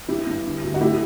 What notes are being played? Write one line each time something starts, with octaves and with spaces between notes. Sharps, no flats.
G2 E4 G4
G2
D3
D2
F#4
A3 E4 G4